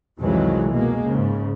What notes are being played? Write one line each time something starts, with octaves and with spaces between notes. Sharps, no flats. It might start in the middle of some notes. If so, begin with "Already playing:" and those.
C2 F2 D#3 E3 F#3 G#3
B2 G#3 A#3
G#2 C#3